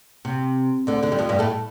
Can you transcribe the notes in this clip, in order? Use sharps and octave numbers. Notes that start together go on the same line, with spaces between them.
C3
D2 D3
D2 D3
G3
F2 F3
G2 G3
A2 A3